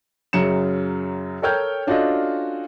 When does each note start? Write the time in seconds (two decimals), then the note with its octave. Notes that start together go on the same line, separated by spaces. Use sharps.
0.33 F#2 C#3 F#3 C#7 E7
1.42 A4 A#4 C#5 G5 F6 G6
1.87 C#4 D4 F4 F#4 A4 D#5